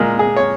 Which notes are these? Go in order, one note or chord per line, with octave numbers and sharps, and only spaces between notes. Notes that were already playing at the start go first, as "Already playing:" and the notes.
Already playing: A#2 G#3 A#4
G#4
C#5